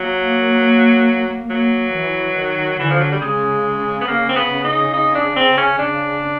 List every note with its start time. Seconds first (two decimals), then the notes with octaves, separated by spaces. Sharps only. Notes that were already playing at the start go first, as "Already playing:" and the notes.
Already playing: F#3 A#3
1.50 F#3 A#3
1.93 E3
2.35 D#3
2.79 D3 E3
2.90 F3
3.00 F#3
3.11 G3
3.21 C#3 G#3
4.01 B3
4.08 A#3
4.29 C4
4.36 B3
4.64 D#4
4.93 D#4
5.15 D4
5.36 C4
5.58 C#4
5.79 C#3 D4